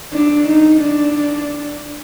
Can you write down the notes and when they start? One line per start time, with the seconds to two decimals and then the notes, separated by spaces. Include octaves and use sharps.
0.14 D4
0.48 D#4
0.82 D4